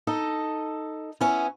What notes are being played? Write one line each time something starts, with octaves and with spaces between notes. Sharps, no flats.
D#4 A4 D#5
B3 C#4 E4